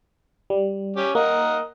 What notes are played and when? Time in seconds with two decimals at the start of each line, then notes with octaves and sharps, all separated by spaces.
0.50 G3
0.96 C#4 G4
1.15 A#3 A#4 D#5 F#5